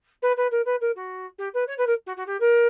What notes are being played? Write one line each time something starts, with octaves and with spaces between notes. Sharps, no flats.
B4
B4
A#4
B4
A#4
F#4
G4
B4
C#5
B4
A#4
F#4
F#4
G4
A#4